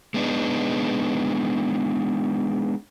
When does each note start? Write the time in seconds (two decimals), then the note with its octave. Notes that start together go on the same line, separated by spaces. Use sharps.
0.14 G#3 B3 D4 D#4